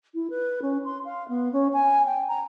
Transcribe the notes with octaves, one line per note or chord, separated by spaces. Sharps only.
E4
B4
C#4
C6
F5
B3
C#4
G#5
G5
A#5